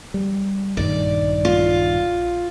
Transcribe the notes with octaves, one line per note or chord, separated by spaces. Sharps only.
G3
A#1 G2 D#3 D5
F4